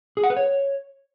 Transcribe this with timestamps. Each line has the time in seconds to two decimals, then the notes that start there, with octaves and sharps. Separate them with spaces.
0.17 G#4
0.24 F#5
0.30 B4
0.37 C#5